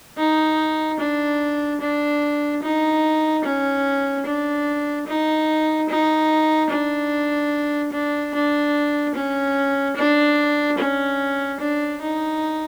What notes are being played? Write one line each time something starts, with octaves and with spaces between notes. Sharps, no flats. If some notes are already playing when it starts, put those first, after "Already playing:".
D#4
D4
D4
D#4
C#4
D4
D#4
D#4
D4
D4
D4
C#4
D4
C#4
D4
D#4